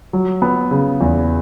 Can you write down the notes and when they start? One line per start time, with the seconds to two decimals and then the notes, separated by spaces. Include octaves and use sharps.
0.13 F#3
0.42 B3
0.71 C#3
1.01 E2